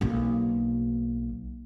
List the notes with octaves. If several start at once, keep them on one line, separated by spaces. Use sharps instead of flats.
B1 A#3